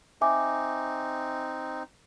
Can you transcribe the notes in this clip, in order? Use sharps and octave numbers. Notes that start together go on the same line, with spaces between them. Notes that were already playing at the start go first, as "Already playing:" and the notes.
C4 D#4 E5 G#5 D6